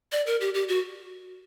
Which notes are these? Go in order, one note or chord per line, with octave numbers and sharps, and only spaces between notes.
D5
A#4
G4
G4
F#4